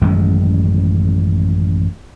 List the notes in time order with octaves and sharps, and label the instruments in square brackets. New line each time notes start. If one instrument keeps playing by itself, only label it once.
[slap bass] A1 F#2 D#3 G#3